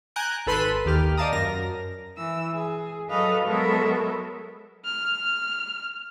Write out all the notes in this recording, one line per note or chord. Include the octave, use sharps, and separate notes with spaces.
G#5 A#5 F#6 G6 D7
G#1 A4 B4 B5 C6 D#7
D#2 D#3 G4 F6
D5 D#5 F5 A5 A#5 D#6
F#2 A#4 A#6
E3 E6
G#4
F#3 A4 B4 D#5 F5
F#3 G#3 B3 A4 A#4 E5
F6